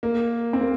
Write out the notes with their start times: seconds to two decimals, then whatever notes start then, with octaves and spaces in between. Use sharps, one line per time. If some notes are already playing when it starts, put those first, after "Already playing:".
0.03 A#3
0.53 C4
0.61 A#3